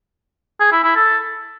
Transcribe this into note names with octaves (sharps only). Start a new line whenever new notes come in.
G#4
E4
E4
A4